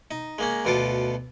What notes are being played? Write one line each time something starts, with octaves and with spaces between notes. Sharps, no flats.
D#4
G#3 A#3 C#4
D2 B2 B3 F4 A4 D6